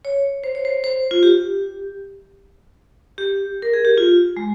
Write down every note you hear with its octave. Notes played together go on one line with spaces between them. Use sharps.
C#5
C5
C#5
C5
C5
F4
G4
G4
A#4
G#4
G4
F4
G#3